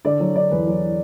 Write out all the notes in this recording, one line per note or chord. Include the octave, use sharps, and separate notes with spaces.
D3 D5
F#3
D3 D5
E2 B4
F#3